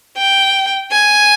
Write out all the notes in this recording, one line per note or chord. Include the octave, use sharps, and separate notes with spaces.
G5
G#5